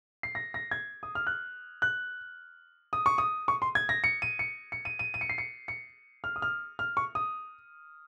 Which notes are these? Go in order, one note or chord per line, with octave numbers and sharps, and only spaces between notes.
C7
A#6
A#6
G#6
D#6
F6
F#6
F#6
D#6
C#6
D#6
C#6
C6
G#6
A#6
C#7
D#7
C#7
C#7
D#7
D#7
D#7
C#7
C7
C#7
C#7
F6
D#6
F6
F6
C#6
D#6